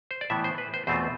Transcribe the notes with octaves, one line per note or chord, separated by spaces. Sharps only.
C5
D5
A2 E3 B3 E5
C5
B4
C5
E2 B2 A3 C4 F4 C5